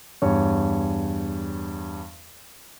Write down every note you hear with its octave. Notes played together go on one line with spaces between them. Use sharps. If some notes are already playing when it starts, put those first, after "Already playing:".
E2 G2 C#5